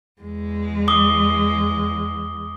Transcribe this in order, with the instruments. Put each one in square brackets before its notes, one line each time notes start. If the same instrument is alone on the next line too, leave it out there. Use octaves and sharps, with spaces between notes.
[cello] E2 G#3
[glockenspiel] D6 D#6 G7